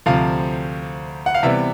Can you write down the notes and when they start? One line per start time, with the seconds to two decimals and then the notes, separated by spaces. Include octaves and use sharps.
0.06 D2 C3 F3 F5
1.26 F#5
1.34 F5
1.43 C3 E3 G3 B3 E5